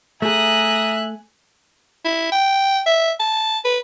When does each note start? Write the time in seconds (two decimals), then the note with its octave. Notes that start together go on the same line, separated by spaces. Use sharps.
0.22 A3 G#4 E5 G#5 A#5 D#6 F#6
2.05 E4
2.32 G5
2.86 E5
3.20 A5
3.65 B4